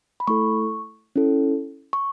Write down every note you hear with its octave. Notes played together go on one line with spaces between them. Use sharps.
B5
A3 E4 A4 C#6
C#4 E4 A4
C#6